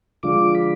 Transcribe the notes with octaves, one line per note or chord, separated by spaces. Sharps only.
D3 F3 G#3 D4 F4 D6
B5